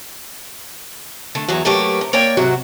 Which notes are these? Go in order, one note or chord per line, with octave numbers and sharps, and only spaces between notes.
D3 A3
E2 E3 F#3 F#4
F#3 A3 A#3 G4 A#4 B4
C3
A#3 C#5 D5 G5
G#2 C3 F#3 F#4